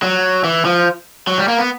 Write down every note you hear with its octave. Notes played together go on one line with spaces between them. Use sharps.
F#3
E3
F3
F#3
G3
A#3
B3